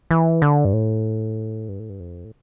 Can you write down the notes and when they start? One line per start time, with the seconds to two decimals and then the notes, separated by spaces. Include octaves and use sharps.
0.11 E3
0.42 D3
0.65 G2
0.73 A2
1.69 G2
1.79 A2
1.89 G2
2.00 F2
2.25 A2